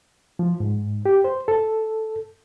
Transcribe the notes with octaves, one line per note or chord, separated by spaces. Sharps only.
F3
G#2
G4
C5
A4